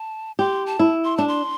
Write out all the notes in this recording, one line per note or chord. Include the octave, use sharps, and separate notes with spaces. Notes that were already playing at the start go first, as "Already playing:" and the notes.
Already playing: A5
G4 C6
A5
E4
C6
D4 A5
C6